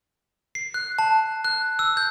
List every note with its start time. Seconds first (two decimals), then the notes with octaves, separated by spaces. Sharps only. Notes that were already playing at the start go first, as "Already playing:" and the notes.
0.55 C7
0.74 F#6
0.99 A5
1.45 F#6
1.79 E6
1.97 G6